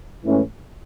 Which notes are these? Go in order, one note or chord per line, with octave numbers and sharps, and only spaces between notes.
G#2 E3 A3 C#4